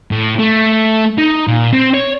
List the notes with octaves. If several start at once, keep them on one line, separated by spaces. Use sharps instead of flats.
A2
A3
D#4
A#2
C4
C#5